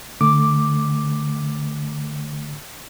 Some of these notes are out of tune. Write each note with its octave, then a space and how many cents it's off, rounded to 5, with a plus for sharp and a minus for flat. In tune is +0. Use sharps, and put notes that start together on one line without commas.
D3 +10 A3 +0 D6 +0